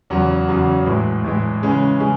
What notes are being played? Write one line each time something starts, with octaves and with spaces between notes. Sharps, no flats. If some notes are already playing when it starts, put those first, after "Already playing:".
E2 C#3 F#3
E2 C#3 F#3
A2 E3 G#3
A2 E3 G#3
C#3 E3 G#3 C#4 G#4
C#3 E3 G#3 C#4 G#4